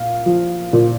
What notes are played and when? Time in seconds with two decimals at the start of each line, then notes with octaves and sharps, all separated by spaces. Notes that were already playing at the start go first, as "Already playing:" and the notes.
Already playing: A#2 F5
0.26 F3
0.73 A#2